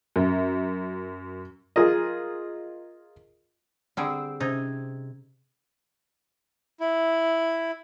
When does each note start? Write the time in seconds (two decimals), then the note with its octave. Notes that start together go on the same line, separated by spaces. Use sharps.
0.16 F#2
1.76 F4 G#4 A#4 D#5
3.97 D3 G3 C4 G#4 E6 D7
4.40 C3 C#4 D#4 C5 G#6
6.80 E4